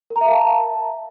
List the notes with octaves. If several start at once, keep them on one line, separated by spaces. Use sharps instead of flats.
A#4
A#5
E5
F5
A5